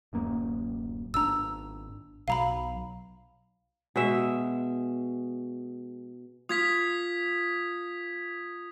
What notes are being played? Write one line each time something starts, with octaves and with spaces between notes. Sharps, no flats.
D1 F#2 A#3
G#1 D4 A#5 E6
B1 F#3 F5 A#5 B5
B2 G#3 E5
F4 D#6 G#6 B6